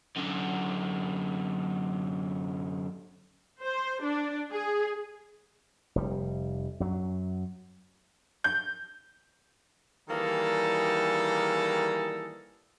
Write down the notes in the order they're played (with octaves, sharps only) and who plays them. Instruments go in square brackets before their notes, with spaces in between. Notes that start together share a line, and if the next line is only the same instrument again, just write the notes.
[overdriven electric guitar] F#2 D3
[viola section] C5
D4
G#4
[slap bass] F1 G3
F#2 F#3
[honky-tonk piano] G6
[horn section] D#3 E3 G3 A#3 G#4 A4